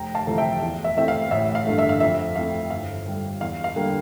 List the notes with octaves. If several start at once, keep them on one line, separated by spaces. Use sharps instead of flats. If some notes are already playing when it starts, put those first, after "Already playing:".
Already playing: F1 G5 A#5
F5 A5
F2 C3 E3 A3
E5 G5
E2
E5
E3 A3 C4 E5
F5
A1 E5
F5
G2 D3 A3
E5
F5
F2 E5
E3 A3 C4 F5
G1 F5
G2 D3 G3
E2 F5
F5
D3 G3 A#3